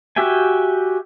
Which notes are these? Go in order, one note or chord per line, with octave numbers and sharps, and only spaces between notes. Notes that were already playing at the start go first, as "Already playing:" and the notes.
F#4 G4 E5 G5 G#5